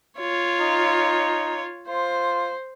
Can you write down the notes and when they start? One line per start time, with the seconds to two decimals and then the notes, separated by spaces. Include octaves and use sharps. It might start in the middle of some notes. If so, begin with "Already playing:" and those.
0.20 F4 C#5
0.60 D#4
1.88 F4 C5